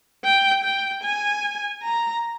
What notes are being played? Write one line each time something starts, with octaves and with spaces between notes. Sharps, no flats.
G5
G5
G#5
A#5